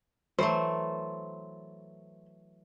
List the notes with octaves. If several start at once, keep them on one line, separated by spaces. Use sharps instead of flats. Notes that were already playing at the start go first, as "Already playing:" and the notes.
E3 F#3 A3 C5